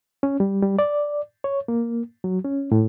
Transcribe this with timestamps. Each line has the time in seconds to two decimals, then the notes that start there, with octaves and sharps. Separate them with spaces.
0.23 C#4
0.40 G3
0.62 G3
0.79 D5
1.44 C#5
1.68 A#3
2.24 F#3
2.45 C#4
2.72 A2